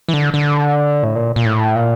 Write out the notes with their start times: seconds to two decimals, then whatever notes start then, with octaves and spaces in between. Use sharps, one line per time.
0.09 E3
0.13 D3
0.34 D3
1.03 A2
1.15 A#2
1.36 A#2
1.45 A2
1.75 A#2